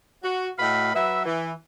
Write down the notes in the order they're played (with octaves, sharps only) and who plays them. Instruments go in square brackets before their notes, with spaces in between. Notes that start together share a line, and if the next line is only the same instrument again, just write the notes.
[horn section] F#4
A2 F#4 D#5 F5 B5
F#3 B4 E5
E3